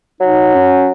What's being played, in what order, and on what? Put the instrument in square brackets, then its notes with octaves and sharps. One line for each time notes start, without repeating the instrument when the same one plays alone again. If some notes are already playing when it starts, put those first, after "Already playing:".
[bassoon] F#3 [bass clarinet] D#4
[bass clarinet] C#4